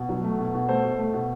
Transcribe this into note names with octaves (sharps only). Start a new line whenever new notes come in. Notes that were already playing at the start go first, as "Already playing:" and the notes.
Already playing: B2
F#3
A3
B2
B2
A3 A4 C5
B2
A3
B2